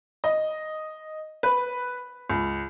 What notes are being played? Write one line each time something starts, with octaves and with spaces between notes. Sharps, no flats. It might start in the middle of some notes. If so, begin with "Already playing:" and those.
D#5
B4
C#2